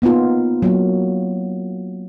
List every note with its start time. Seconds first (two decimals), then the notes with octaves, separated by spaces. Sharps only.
0.02 A#3 B3 D#4 F4
0.62 F#3 A#3